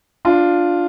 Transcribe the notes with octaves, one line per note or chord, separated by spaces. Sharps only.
D4 F4